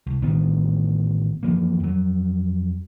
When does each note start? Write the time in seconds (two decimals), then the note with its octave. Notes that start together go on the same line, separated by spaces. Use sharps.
0.07 C2
0.22 A1 A2 D#3 B3
1.43 F#2 E3 F3 A#3
1.80 F2 F#3